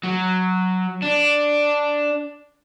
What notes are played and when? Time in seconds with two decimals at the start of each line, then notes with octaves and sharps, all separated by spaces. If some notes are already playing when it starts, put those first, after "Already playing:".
0.04 F#3
1.03 D4